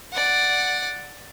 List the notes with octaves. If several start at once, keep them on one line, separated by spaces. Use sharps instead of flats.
D5 F#5